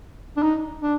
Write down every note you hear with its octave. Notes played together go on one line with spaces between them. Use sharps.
D4
D#4
D4